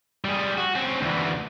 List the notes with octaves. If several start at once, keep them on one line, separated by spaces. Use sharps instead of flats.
G3 G#4
F#4
C4 C#4
D2 E3